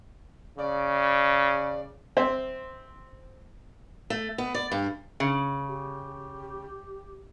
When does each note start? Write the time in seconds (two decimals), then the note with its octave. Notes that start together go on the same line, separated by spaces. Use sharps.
0.58 C#3 D5
2.17 C4 C5 E5
4.10 A3
4.38 B3
4.54 D5
4.71 G2
5.20 C#3
5.69 G4